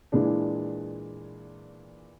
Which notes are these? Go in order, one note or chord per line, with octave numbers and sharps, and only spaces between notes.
A#2 E3 G#3 D4